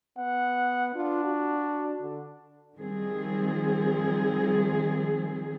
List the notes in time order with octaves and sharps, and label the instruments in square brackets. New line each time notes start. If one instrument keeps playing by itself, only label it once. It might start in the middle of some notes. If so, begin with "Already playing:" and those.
[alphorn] B3 [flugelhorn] F#5
[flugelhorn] D4 [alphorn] F4
[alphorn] F#4
D3
[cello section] D#3 F3 G3 C4 G#4